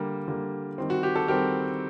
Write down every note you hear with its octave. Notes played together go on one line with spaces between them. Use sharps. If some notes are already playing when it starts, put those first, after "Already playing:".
Already playing: D3 G3 A#3
D3 G3 A#3
D#3 G3 C4
F#4
G4
A4
D#3 G3 C4 G4 A#4